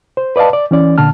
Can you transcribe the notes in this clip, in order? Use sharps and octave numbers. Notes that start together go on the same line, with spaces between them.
C5
B4 D5 D#5 F5 A5
D5
E3 C#4 D5
A#2 D3 A5 F6